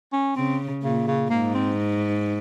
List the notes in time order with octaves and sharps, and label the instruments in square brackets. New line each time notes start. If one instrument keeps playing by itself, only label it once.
[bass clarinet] C#4
[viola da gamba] C#3 [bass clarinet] C4
[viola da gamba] A#2 [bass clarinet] C#3
[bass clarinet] C#3
[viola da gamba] G#2 [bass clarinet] A#3
[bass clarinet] C4